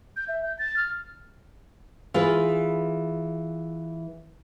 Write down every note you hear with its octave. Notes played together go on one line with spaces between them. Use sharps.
G6
E5
G6
A6
F6
E3 F4 G#4 B4